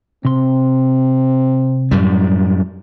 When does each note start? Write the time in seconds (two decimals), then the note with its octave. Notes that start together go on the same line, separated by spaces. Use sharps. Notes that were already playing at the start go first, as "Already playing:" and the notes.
0.25 C3 C4 C6
1.91 F#2 A2 G3